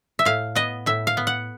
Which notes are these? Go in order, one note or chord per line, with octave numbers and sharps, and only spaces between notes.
E5
A2 F5
B3 D#5
A2 E5
F5
B3
F#5